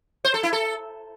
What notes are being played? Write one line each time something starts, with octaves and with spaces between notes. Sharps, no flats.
C5
A4
E4
A4